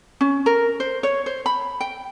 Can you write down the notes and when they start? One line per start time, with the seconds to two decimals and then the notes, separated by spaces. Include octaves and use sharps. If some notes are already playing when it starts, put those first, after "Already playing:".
0.21 C#4
0.46 A#4
0.80 C5
1.03 C#5
1.26 C5
1.46 B5
1.81 G5